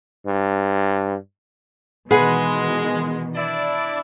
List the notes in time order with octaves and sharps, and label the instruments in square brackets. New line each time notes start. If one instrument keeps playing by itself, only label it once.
[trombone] G2
[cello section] B2 D#3 E3 [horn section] G#3 [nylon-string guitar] G#4 [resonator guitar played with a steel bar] B4 F#5
[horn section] D4 E4 D5